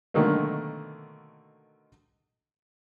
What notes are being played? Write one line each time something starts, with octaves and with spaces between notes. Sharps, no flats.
B2 D3 D#3 F#3 A3 A#3